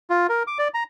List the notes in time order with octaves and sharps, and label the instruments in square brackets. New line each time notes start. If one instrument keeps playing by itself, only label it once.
[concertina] F4
A#4
D6
D5
A#5